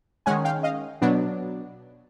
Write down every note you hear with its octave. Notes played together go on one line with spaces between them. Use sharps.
D#3 G#3 C#4 F#5 G#5
F5 G5
D#5 F5
B2 F#3 B3 D4